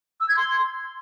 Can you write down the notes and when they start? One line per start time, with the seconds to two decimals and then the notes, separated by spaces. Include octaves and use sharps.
0.20 E6
0.29 G#6
0.37 C6